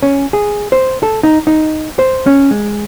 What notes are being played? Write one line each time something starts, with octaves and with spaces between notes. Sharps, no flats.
C#4
G#4
C5
A4
D#4
D#4
C5
C#4
G#3